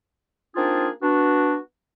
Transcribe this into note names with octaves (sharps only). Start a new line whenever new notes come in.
A#3 C4 D4 D#4 F4 G#4
B3 D4 F#4